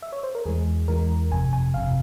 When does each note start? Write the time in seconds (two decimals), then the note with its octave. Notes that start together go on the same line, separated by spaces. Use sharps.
0.02 E5
0.12 C#5
0.23 C5
0.35 A#4
0.46 E2 E3 G#3 G#4
0.88 E2 E3 G#3 A#4
1.31 G1 F2 C3 G#5
1.53 G#5
1.74 G1 F2 C3 F5